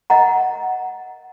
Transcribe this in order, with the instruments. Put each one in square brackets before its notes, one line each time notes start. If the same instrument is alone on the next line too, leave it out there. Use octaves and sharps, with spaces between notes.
[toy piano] A#4 D#5 F#5 A#5